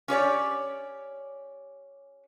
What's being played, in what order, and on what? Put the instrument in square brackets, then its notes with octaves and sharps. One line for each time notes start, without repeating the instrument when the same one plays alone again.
[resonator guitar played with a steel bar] C#4 G4 C#5 D5